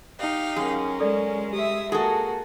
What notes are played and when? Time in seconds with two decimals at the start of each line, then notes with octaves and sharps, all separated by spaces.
0.19 D#4 G4 F5
0.56 F#2 C#4 G#4 A#4
1.00 G#3 A4 D5
1.53 G4 E5 D#6
1.92 A#3 F#4 G#4 A4